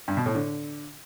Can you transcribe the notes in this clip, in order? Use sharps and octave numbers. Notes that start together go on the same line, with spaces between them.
G2
B2
A2
D3